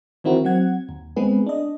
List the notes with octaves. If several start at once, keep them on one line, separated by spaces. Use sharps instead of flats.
D#3 E3 C4 E4 F#4 A#4
F#3 C4 F#5 G#6
D#2
G#3 B3 C4 G#4 B4
D4 D#5